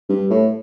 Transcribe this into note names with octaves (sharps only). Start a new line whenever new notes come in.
G2
A2